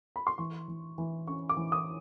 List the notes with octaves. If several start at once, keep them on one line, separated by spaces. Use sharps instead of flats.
B5
C6
E3 C#6
E3
E3
C#4 C#6
D6
E3
D#6